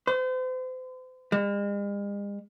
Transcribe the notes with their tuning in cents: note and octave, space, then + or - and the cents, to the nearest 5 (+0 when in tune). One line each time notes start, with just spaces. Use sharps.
C5 -40
G#3 -45